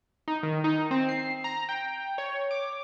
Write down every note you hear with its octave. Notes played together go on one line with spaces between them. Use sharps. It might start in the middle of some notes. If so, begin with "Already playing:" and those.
D#4
D#3
D#4
C4
C7
A#5
G5
C#5
D6